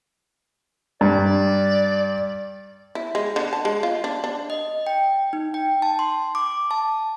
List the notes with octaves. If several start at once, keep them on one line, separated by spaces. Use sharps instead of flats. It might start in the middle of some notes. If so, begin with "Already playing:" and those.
G2 D5
E4
G#3
D3
A5
G#3
F4
D4
D4
D#5
G5
D#4
G5
A5
C6
D6
A5